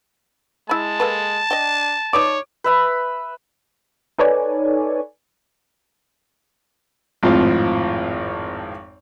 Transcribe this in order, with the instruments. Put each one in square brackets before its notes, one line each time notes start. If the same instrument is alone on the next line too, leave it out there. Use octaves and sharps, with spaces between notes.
[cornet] G#3 [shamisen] E4 B5 [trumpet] A5
[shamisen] A#3 A4 B4
[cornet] D4 [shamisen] D#5 G5
[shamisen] D#4 B4 D5 [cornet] C#5 [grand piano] D6
[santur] B4 E5 B5
[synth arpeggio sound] D#4 A4 B4 C#5 D5 G#5
[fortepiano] G#1 F2 A2 F3 F4 F5